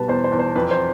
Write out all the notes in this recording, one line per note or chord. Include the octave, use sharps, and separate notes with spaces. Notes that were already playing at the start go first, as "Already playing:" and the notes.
Already playing: B2 G3 B4 A5
E2 C5
C5
E2
C5
F2 B4
C5